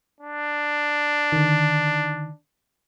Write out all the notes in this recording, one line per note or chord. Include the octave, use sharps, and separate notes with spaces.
D4
D3 D#3